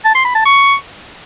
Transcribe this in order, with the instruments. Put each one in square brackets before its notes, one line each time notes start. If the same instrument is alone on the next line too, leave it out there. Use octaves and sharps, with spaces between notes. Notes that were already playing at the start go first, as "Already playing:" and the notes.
[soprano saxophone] A5
C6
B5
A5
C#6